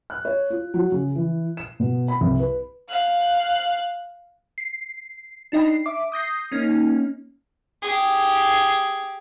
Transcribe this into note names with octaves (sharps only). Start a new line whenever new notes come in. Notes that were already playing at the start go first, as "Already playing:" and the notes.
F#6
C#5
F4
F#3
C#3
E3
E7
B2
B5
C2
B4
F5 F#6
C7
D4 D#4 D#5 G5 B5
C7
E5 D6
D#6 G6 A#6 C7
A#3 C#4 D#4
G4 G#4